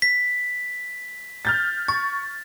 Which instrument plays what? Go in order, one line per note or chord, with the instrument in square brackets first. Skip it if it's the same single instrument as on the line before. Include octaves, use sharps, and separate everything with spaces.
[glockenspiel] B6
[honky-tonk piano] F6 G6 A6
[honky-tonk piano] C#6 [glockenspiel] A6